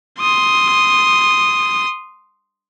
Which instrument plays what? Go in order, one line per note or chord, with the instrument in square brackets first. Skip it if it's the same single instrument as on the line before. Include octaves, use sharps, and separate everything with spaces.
[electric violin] C6 D#6